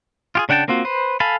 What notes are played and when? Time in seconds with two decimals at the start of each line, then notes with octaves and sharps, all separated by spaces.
0.35 F4 G4 G#4
0.49 C#3 D4 F#5 G5 A5
0.68 A#3 C4 F4 F#4
0.85 B4 C5
1.20 A4 F5 G#5 A5 B5